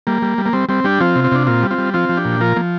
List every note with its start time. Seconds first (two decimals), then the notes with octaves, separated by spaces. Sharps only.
0.07 G3 A#3
0.22 G3
0.38 G3
0.46 A#3
0.53 G3 C4
0.69 G3 C4
0.84 G3 D4 G4
1.00 F3 C4 F4
1.16 C3
1.24 C4
1.31 C3 D4
1.47 A#2 C4 F4
1.63 G3
1.71 C4 F4
1.78 G3
1.94 F3 C4 F4
2.09 F3
2.17 D4 G4
2.25 A#2
2.40 F3 F4 A#4
2.56 F3 A#3